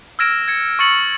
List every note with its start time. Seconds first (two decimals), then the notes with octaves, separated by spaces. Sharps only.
0.19 E6 F6 G#6 A#6 D7 E7
0.48 G#6 C#7
0.79 C#6 E6 A6 C#7 F#7